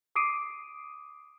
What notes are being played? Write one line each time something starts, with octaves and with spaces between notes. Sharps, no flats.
D6 D#6 C7 D7 D#7